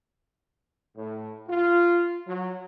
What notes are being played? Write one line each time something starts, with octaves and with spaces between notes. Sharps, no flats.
A2
F4
F#3